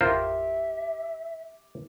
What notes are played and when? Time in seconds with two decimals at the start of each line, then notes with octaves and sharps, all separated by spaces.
0.01 A1 F2 F4 G4 A#4 C5 E5